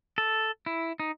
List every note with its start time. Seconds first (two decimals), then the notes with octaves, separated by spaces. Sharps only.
0.18 A4
0.66 E4
1.00 D#4